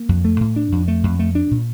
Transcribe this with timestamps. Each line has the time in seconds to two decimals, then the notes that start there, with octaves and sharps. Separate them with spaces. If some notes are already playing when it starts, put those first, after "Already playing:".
Already playing: A#3
0.09 F2
0.25 A3
0.40 A2
0.56 D4
0.72 F2
0.88 A3
1.04 F2
1.19 A3
1.35 D4
1.51 A#2